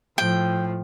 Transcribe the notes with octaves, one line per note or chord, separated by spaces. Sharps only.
A2 F3 G5